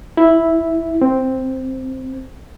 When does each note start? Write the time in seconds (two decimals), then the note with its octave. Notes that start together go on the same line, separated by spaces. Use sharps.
0.17 E4
1.01 C4